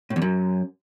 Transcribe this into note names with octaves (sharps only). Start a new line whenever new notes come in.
A2
E2
F#2